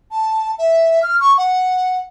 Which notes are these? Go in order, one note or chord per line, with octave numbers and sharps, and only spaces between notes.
A5
E5
F6
C#6
F#5